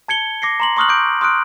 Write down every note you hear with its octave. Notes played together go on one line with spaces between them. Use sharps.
A5 G#6 C#7 G7
D6 A#6 C7 C#7
A#5 C6 F#7
C6 C#6 D#6 F6 F#6 F#7
D6 G6 D7
C6 D#6 F6 F#6 D7